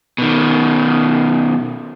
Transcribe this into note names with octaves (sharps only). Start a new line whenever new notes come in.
B2 D#3